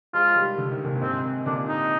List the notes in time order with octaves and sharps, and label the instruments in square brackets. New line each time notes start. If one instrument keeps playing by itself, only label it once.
[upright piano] F3 G#3 [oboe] F4
[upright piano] D#3 G3
D3
D#3
A#2 D3
A#2
[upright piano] G#2 C3 [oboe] C4
[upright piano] A#2 D3 [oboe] D4
[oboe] D#4